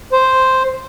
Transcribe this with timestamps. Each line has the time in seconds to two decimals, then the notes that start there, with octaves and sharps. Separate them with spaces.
0.12 C5